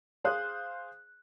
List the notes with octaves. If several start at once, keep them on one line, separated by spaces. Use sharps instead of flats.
G#4 C5 F5 D#6 F#6